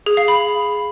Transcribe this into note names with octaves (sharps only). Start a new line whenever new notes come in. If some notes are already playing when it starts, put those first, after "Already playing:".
G#4
F5
B5